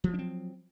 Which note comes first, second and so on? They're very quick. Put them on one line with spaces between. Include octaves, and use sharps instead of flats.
F3 F#3 D4 C4